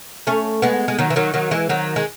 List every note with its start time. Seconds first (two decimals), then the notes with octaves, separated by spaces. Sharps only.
0.27 A3 C#4
0.62 G#3 B3
0.88 G#3
0.99 D#3 F#3
1.10 E3
1.16 D#3 F#3
1.34 D#3 F#3
1.51 E3 G#3
1.69 D#3 F#3
1.96 G#3